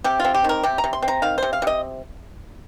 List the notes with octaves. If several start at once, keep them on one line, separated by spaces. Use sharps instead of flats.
C3 G4
F4
C4
G4
D#3 A#4
C3 G4
A#5
C3
C6
C4
A#5
D#3 F5
C3 C5
F5
C3 D#5